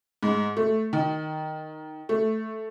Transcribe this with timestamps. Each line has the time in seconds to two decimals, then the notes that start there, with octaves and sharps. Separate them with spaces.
0.23 G#2
0.57 A3
0.93 D#3
2.09 A3